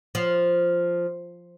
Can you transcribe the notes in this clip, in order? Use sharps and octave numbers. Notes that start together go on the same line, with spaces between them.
F3